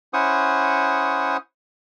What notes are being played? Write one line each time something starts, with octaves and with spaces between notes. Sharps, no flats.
C#4 E4 C5 F#5 C#6 D#6